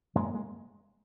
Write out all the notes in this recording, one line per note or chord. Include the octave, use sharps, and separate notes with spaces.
F#2 G#3 A#3
G#3